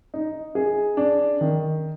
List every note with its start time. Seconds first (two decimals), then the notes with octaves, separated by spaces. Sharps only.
0.14 D#4
0.55 G#4
0.97 D4
1.41 D#3